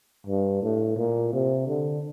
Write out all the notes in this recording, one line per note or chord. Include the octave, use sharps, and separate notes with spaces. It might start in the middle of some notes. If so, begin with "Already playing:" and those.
G2
A2
A#2
C3
D3